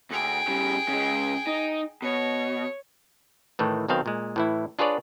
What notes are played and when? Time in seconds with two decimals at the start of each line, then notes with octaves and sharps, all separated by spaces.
0.10 D2 G#4 G5
0.48 C#3 G3
0.89 C#3 G#3
1.47 D#4
2.02 B2 C#5
3.59 A2 D#3 E3 A3
3.88 B1 B2 D#3 C4 F5
4.06 A#2 G#3
4.36 A2 E3 E4
4.79 D4 F4 G#4 B4 C#5 D5